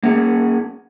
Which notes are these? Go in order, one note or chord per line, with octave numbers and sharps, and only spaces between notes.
A#3 C#4 G#4